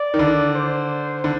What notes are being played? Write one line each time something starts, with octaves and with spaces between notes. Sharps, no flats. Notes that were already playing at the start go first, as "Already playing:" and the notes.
Already playing: D5
D#3
D3
C5
D3